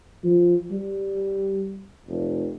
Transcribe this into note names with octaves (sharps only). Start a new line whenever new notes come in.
F3
G3
F1